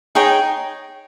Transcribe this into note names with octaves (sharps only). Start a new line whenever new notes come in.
D#4 G#4 C#5 G5